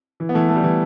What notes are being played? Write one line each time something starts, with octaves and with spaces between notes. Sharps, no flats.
E3
B3
E3 A3
A3
G3
E3